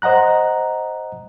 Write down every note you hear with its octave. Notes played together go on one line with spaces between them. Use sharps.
C5 D#5 F#5 A#5 F#6